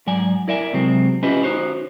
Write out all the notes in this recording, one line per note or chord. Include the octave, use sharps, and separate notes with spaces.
G#2 F#3 D5 G#5
E4 A#4 D5 E5 F5 G#5
C3 F#3 G#3 C4
C#4 E4 F4 G4 B4 D#5
D#4 F4 F#4 C5 C#5